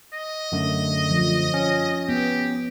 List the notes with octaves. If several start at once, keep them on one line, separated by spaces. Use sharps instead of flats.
D#5
F#2 D3 A3
F3
C#4
B3 G4